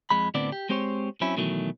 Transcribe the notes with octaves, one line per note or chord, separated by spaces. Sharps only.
F2 G#3 B5
A2 D3 B3 C4 D4 D5
G4
G#3 C4 G4 C5 C#5
F#3 C4 C#4 E4
B2 D#3 E3 F#3 A3